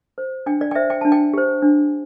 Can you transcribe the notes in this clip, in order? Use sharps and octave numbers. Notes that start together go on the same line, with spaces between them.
C5
D4 G5
D5
G5
C5 E5
G5
D4 A5
G5
G4 C5
D4